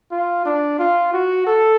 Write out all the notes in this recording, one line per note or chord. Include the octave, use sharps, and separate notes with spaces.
F4
D4
F4
F#4
A4